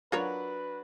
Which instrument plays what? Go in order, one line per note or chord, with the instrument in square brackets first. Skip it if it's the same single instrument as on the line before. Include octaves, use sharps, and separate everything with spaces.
[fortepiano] F#3 D4 F#4 [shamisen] F4 A#4 C#5 [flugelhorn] B4